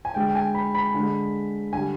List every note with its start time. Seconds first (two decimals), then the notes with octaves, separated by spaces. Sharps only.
0.05 G#5
0.14 D3 G#3 G5
0.29 G5
0.35 G#5
0.54 B5
0.75 B5
0.94 D3 G#3
1.73 D3 G3 G#5